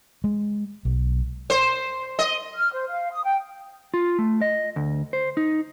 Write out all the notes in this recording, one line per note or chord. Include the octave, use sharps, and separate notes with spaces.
G#3
B1
C5
D#5
F6
C5
F5
D#6
G5
F4
A3
D#5
D2
C5
D#4